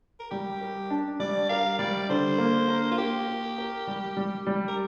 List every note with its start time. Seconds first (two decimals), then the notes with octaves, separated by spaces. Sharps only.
0.20 A#4
0.31 G3 G4
0.61 A#4
0.90 D4
1.19 G3 D5
1.49 A#4 F5
1.79 G3 D5
2.10 D3 C5
2.38 A#3
2.68 A#4
2.91 F4
2.98 A#3 G4
3.28 A#4
3.58 A#4
3.87 G3
4.17 G3
4.47 G3
4.68 A#4